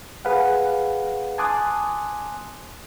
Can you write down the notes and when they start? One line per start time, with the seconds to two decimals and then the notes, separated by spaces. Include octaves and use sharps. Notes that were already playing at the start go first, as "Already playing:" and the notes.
0.25 G#4 B4 F5 F#5
1.38 G#5 A5 C6 D6 D#6 F#6